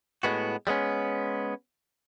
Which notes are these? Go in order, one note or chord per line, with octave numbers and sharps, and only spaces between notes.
A2 G#3 B3 F#4
G3 G#3 B3 C#4